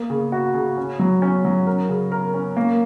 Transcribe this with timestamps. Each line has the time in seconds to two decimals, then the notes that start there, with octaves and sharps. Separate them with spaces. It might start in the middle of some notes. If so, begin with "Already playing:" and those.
Already playing: A#3
0.10 C#3
0.32 F#4
0.54 C#3
0.77 C#4
0.99 F#3
1.22 C#4
1.45 F#3
1.67 A#4
1.89 C#3
2.12 A#4
2.34 C#4
2.57 A#3